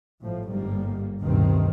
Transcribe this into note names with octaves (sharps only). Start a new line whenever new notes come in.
G#1 A2 F3
G1 G#2 G3 A#3
A1 D2 G2 B2 D#3 C4